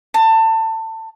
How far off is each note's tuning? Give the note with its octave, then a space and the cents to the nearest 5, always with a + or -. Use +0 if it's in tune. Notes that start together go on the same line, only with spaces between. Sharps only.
A5 +25